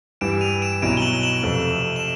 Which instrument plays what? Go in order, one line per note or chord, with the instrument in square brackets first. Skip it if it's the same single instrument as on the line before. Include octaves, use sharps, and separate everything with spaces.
[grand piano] G2 E3 G3 [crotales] D7 E7
[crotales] D#7 F7
D7 E7
[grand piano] B1 B2 F#3 B3 E4 [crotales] D7 E7
[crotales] G7
E7 F#7
E7 F#7
[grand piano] F2 C3 F3 A3
[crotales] E7